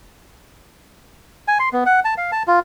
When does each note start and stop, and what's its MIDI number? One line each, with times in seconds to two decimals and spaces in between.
1.48 1.58 80
1.59 1.69 84
1.73 1.84 59
1.86 2.00 78
2.05 2.14 81
2.18 2.31 77
2.32 2.43 81
2.48 2.59 65